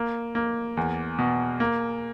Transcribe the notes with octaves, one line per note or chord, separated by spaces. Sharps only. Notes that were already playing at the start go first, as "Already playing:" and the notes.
Already playing: A#3
A#3
E2
B2
A#3